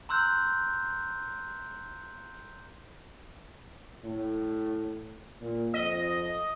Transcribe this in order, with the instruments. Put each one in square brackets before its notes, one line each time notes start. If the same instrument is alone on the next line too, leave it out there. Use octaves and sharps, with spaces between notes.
[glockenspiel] A#5 C6 E6 F#6 G6
[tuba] A2
A#2
[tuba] F2 [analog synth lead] D#5